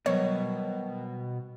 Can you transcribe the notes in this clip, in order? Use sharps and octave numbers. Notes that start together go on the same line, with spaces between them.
B2 D#3 F#3 G3 C5 C#5